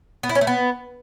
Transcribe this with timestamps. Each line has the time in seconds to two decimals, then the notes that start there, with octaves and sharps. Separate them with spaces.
0.23 B3
0.29 E4
0.35 C#4
0.41 A3
0.47 B3